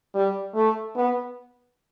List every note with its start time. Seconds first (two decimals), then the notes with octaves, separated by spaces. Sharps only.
0.15 G3
0.55 A3
0.96 B3